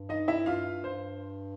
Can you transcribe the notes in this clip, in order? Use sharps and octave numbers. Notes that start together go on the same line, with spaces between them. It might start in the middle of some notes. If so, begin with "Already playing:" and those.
Already playing: G2
D#4 D#5
E4 E5
G2 F4 F5
C5